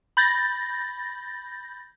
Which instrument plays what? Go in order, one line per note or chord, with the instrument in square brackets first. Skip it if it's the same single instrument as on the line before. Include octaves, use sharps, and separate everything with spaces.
[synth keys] B5 G6 A6 A#6